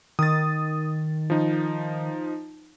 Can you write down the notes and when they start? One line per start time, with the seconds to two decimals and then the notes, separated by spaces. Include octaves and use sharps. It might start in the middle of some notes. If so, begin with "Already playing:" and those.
0.19 D#3 D#6 A6
1.30 F3 D#4